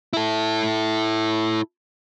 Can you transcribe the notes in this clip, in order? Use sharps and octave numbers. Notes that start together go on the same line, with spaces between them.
E4 A4